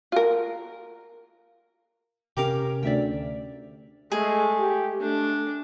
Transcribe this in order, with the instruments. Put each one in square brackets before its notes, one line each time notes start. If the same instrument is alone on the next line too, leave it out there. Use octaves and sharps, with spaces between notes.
[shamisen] F4 A#4
[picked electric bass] C3 C#4 [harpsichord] G4 A#4 F5
[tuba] D2 [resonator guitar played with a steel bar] D5 E5 G5
[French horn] G#3 [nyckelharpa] A3 [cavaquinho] G#4
[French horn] G4
[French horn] A3 [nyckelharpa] D4